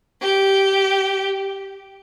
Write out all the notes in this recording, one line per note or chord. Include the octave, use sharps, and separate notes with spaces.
G4